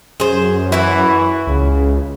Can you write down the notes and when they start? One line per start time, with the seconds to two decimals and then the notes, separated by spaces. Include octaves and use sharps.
0.20 F#2 G#4 C5
0.72 E3 E4 F#4
1.47 C#2 C#3